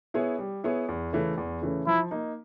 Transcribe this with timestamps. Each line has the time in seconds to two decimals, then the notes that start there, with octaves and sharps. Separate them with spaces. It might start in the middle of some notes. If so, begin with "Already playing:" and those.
0.14 B3 E4 G#4 C#5
0.39 G3
0.64 B3 E4 G#4 C#5
0.89 E2
1.13 C#3 E3 A3 C#4
1.38 E2
1.61 C#3 E3 A3 C#4
1.87 F3 E4
2.11 A#3 D#4